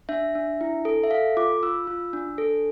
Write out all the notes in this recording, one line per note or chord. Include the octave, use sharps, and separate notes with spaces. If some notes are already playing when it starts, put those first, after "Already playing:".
D4 E5
D4
E4
A4
E5
A4 F5
F4 D6
F4 E6
F4
D4
A4